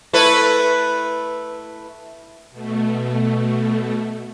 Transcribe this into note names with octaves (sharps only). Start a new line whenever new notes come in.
A3 E4 B4
B2 A3